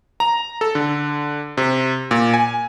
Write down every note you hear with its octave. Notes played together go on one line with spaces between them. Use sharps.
A#5
A4
D3
C3
A#2
G#5